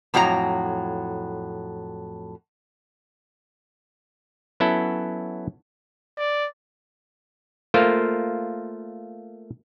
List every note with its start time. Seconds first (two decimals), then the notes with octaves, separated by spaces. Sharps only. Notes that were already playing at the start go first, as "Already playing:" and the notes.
0.14 F2 A2 F#3 F#4 A#5
4.60 F#3 B3 C#4 E4 A4
6.18 D5
7.74 A3 A#3 F4 A#4 C5